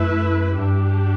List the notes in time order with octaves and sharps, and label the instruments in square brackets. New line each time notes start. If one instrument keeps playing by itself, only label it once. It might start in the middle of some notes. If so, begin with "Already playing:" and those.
Already playing: [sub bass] F#2 [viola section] A3 E4 B4 E5
[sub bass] G2 [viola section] G3 D4 G4